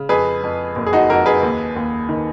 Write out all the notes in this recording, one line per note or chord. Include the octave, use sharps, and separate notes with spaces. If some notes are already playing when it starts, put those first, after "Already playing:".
Already playing: C#3
F2 G#4 B4
F2
F#1
G#4
D#4 F#4
F2 F#4 A#4
G#4 B4
D#2
D#2
D#3